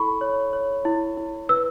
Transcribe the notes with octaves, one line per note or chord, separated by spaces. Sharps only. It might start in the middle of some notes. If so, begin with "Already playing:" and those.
Already playing: E4 A4 B5 C#6
C#5
C#5
E4
E4
B4 E6